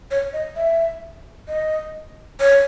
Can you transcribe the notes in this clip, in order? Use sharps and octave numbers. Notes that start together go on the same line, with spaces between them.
C#5
D#5
E5
D#5
C#5